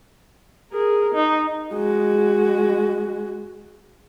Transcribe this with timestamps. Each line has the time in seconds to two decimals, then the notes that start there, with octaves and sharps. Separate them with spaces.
0.72 G#4 A#4
1.14 D#4
1.74 G#3 F#4